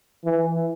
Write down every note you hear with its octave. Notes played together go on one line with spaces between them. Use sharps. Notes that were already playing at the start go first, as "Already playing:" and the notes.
E3